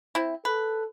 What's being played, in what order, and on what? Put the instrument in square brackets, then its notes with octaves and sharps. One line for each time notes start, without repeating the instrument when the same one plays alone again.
[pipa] C4 E4
[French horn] A4 [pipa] B4